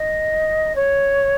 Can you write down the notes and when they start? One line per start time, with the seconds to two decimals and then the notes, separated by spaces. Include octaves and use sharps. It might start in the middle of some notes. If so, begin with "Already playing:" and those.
Already playing: D#5
0.75 C#5